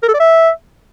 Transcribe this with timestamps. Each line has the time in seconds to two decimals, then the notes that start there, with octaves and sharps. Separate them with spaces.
0.03 A#4
0.08 A4
0.14 D5
0.20 E5